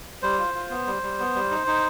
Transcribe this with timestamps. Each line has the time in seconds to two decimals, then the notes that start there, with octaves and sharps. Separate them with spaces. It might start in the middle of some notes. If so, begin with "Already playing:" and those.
0.22 G3 C5
0.38 F4
0.54 F4
0.70 B3
0.87 G3
1.03 G3
1.20 B3
1.35 G3
1.51 D#4
1.67 D#4